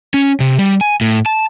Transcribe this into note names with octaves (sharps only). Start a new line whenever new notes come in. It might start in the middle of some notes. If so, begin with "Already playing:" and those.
C#4
C3
G3
G#5
A2
A5